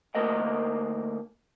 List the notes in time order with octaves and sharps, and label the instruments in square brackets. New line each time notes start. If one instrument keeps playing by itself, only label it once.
[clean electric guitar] D2 A3 A#3 A#4 D#5 F#5